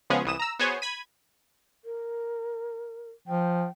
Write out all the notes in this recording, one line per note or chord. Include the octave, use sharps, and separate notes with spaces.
C#3 F3 G#3 B3 C#4 G#4
C2 E3 D#6 E7
A#5 E6
B3 F#4 G#4 C5 C#5 G#5
B5 G#6 B6 D#7
A#4
F3 G5